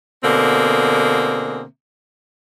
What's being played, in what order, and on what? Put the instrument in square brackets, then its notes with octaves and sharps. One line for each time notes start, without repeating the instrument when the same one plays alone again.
[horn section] B2 D3 A#3 C4 G#4